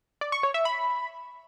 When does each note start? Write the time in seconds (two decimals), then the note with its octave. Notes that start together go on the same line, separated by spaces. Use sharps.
0.21 D5
0.32 C#6
0.43 C#5
0.54 E5
0.65 B5